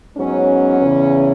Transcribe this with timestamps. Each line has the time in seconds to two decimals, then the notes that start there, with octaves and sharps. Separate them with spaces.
0.16 G#2 F#3 B3 C#4
0.80 E2 C#3 E3